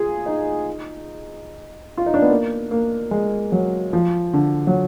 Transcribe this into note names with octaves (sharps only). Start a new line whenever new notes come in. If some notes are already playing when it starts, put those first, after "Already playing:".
Already playing: F4 G#4
D#4
F4
D#4
D4
B3
A#3
A#3
G#3
F#3
F3
D3
F#3